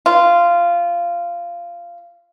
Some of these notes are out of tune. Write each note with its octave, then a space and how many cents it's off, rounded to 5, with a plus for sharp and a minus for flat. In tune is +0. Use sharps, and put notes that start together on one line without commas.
F4 -15